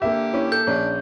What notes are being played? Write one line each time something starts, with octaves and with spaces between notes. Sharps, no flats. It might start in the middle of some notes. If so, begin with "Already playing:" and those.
D3 A#3 G4 E5
C#4 E4
A4 G6
A#1 C#4 D4